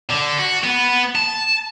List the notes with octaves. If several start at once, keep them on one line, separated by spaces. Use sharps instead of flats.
D3
F#4
B3
A5